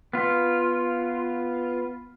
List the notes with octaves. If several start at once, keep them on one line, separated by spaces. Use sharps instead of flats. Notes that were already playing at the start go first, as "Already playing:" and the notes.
B3 F4